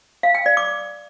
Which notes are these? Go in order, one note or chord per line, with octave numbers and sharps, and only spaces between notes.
F5
G5
D5
D6